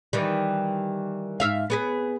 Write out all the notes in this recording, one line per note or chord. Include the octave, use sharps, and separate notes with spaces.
D#3 E3 G3
G#2 E5 F5
B3 G#4 B4